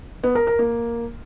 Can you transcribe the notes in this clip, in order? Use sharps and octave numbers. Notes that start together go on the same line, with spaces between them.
B3
A#4
A#4
A#3